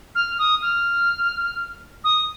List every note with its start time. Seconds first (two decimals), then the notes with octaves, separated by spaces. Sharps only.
0.15 F6
0.39 D#6
0.62 F6
2.04 D#6